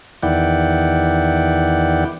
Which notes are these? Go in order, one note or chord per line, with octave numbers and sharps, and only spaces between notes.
E2 D#3 E4 D5 F#5 G5